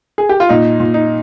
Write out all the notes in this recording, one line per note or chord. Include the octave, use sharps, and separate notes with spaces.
G#4
G4
F4
A#2 D#4
A#2
D#4